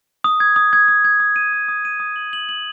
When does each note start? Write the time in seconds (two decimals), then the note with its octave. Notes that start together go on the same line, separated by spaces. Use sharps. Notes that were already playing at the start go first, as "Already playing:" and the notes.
0.24 D#6
0.40 G#6
0.56 D#6
0.73 G#6
0.88 D#6
1.05 G#6
1.20 D#6
1.36 D#7
1.53 D#6
1.68 D#6
1.85 D#7
2.00 D#6
2.16 F#7
2.33 F#7
2.49 F#7